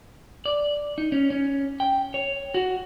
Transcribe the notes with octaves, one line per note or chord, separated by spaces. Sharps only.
D5
D#4
C#4
C#4
G5
C#5
F#4